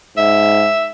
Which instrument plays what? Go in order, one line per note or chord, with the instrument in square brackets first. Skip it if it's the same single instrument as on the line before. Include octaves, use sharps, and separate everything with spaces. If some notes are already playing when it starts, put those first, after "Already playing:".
[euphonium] G#2 [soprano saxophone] E5